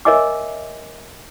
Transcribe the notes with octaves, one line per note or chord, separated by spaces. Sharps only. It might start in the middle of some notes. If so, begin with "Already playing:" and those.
A#4 C#5 D#5 E5 G#5 D6